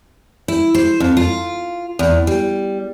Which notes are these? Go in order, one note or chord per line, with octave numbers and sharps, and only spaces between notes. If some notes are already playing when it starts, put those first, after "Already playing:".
E4
C5
F2
F4
E2
G3